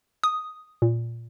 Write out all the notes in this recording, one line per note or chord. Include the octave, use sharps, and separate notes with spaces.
D#6
A#2